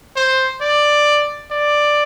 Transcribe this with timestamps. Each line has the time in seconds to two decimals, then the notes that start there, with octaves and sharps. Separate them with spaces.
0.16 C5
0.61 D5
1.51 D5